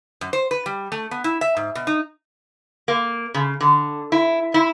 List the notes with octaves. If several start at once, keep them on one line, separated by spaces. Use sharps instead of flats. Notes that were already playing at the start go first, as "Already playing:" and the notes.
F#2
C5
B4
G3
A3
B3
E4
E5
G#2
B2
D#4
A#3
C#3
D3
E4
E4